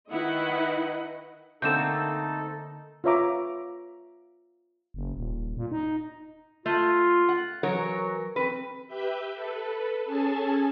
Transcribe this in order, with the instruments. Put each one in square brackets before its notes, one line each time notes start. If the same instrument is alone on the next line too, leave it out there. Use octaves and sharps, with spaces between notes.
[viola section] D#3 D#4 E4 B4 D#5 F#5
[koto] D3 A#3 [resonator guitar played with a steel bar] A3 C4 [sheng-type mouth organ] D#4 A4 [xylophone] G6 E7
[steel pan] F4 B4 C#5 E5 A#5 D6
[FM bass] F#1
D#1
A#2
D#4
[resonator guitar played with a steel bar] A3 [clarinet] F4
[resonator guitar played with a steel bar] F#5
[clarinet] E3 [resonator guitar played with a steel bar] F#3 A#4 C#5
[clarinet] C4 [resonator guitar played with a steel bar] B4
[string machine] G4 B4 E5 G6
A4 B4
C#4 G#4 A4 G#5 A5